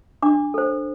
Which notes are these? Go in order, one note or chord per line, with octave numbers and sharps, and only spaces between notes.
D4 D6
A4 C5